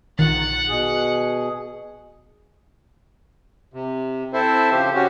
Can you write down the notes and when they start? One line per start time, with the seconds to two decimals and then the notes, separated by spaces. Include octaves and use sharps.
0.19 A#1 D#3 F#5 A6
0.69 B2 G#4
3.74 C3
4.33 C4 E4 A4 C5 E5
4.72 C#3 F3 G4 C5
4.95 C#4 F#4 G4